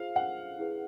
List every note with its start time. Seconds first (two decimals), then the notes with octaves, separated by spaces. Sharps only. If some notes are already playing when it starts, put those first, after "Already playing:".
Already playing: F4 G#4 C5 F5
0.16 F#5
0.59 E4 G#4 B4